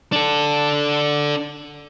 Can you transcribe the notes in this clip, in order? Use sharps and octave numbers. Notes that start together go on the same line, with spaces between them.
D4 A4